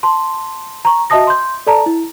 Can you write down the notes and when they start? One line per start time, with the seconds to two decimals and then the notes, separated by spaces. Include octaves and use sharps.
0.03 A5 C6
0.85 A#5 C#6
1.10 F#4 D#5 E5 A5 D#6 A#6
1.27 C6 G6
1.67 A4 D5 A5 A#5
1.86 E4